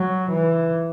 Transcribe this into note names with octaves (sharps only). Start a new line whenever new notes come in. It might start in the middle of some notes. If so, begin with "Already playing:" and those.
Already playing: F#3
E3